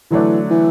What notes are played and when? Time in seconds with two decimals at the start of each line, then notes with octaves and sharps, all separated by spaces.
0.11 D3 E3 F#3 A3 D4
0.50 E3